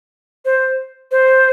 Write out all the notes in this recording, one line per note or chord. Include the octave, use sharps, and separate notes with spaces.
C5
C5